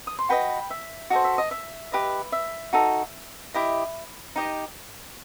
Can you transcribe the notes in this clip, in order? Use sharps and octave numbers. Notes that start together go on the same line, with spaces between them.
D#6
C6
F#4 B4 D#5 G5 B5
E5
F#4 A4 C5 D#5
E5
D#5
E5
G4 B4 D#5
E5
D#4 F#4 A4
E4 G4 D#5
D#4 G4 D#5